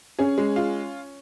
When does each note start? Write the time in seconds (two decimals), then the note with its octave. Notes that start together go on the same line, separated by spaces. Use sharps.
0.19 C#4 G#4
0.38 G#3
0.56 F4